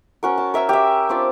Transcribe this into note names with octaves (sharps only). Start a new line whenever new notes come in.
C#4 F#4 A#4
A5
A#4 E5 G#5 A#5
G4 E5
C4 D4 F4 D5